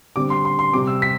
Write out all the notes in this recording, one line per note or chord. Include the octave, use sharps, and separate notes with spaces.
D3 G3 C4 D6
C6
C6
C6
C3 G3 C4 D6
E6
B6